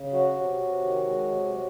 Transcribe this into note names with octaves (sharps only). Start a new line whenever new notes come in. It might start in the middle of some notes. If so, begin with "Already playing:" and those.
Already playing: C#3
F#3 F#4
C3
C3
D#3
G#3
C3
F#3